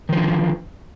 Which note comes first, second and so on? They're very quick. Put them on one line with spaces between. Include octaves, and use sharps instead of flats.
D#3 F3 D3